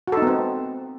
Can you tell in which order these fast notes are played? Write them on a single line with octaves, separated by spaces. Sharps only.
F#4 A4 D#4 B3 C4